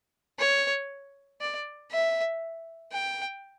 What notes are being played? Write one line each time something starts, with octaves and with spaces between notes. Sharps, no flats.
C#5
D5
E5
G5